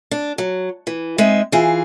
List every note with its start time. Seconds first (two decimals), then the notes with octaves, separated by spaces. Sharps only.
0.11 D4
0.38 F#3
0.87 E3
1.18 G#3 C4 D#4 E5
1.52 E3 F4 G#4